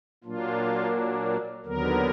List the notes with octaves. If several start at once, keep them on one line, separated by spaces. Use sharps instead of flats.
A#2 F#3 A#3 D4 F4
D#2 D3 F#3 B3 A#4